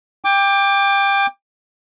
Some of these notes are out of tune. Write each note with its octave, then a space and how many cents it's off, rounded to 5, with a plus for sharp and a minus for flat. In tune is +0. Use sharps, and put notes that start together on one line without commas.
G5 +25 D6 +0